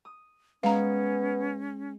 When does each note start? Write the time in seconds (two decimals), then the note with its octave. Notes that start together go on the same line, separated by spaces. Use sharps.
0.05 D#6
0.63 G#3 B3 C#4 F5 A#5